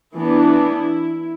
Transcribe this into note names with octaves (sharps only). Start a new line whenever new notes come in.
E3 B3 D4 E4